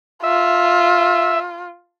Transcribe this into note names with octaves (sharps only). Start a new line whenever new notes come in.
F4 E5